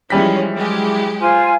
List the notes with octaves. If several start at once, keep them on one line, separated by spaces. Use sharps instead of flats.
E3 F3 G3 G#3 C#4 B6
F#3 G#3 G4
F4 C5 G#5